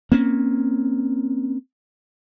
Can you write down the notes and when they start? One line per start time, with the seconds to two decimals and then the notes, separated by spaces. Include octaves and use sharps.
0.12 A#3 C4 C#4